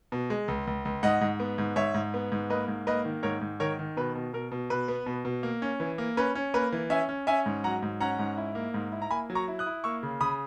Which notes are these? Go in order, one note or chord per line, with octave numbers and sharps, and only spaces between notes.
B2
G#3
C#2
C#2
C#2
G#2 D#5 F#5
G#2
B3
G#2
G#2 C#5 E5
G#2
B3
G#2
A#3 B4 D#5
G#2
A#3 B4 D#5
D#3
G#2 A#4 C#5
G#2
D#3 A#4 C#5
D#3
B2 B4
B2
B2 A#4
B2
B2 B4
B3
B2
B2
A#3
C#4
E3
A#3
C#4 B4
C#4
A#3 B4
E3
C#4 E5 G#5
C#4
C#4 E5 G#5
G#2
F#3 F#5 A#5
G#2
C#4 F#5 A#5
G#2
E4
A#3
G#2
E4
A#5
A#3 G#5 B5
F#3
A#5 C#6
E4
D#6 F#6
E4
A#3 C#6 E6
C#3
C#3 B5 D#6